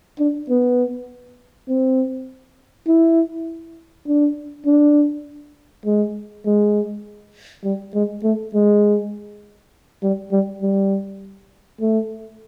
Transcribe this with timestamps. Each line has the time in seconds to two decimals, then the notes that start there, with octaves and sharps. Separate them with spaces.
0.19 D4
0.49 B3
1.68 C4
2.87 E4
4.07 D4
4.66 D4
5.86 G#3
6.45 G#3
7.64 G3
7.94 G#3
8.23 A3
8.54 G#3
10.03 G3
10.32 G3
10.62 G3
11.81 A3